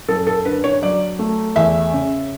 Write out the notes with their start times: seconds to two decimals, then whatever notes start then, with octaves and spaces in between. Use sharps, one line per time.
0.08 F#2 A4
0.27 A4
0.45 D3 B4
0.64 C#5
0.82 F#3 D5
1.19 A3
1.56 E2 E5
1.93 C#3